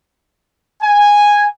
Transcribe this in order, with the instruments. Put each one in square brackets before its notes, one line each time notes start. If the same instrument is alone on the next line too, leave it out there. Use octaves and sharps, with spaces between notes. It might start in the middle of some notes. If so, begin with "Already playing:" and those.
[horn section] G#5